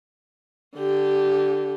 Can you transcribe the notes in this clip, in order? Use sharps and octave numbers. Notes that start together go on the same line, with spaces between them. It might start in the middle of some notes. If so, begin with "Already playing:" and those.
D3 G4